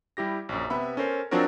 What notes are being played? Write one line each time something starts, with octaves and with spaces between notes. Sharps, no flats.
G3 E4 G4 A#6
A#1 F#2
C3 B3 E5 B5
C#4 A4 A#4 C5
F3 F#3 C4 D4 F#4 A#4